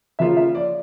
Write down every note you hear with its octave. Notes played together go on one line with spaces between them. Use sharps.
C#3 F3 A#3 C#4 F4 E5
E5
D5